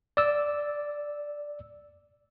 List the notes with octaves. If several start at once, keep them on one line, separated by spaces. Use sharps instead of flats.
D5 E6